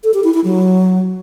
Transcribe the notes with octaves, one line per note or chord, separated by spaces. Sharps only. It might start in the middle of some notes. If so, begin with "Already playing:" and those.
A4
G4
E4
E4
F#3